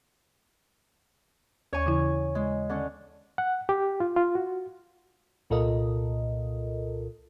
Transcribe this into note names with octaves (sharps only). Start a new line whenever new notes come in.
D#2 C#5 G#5 C#6
C#3 E3 E4
G#3
D3 C#4
F#5
G4
F4
F4
F#4
C2 A#2 F4 A4 A#4 D#5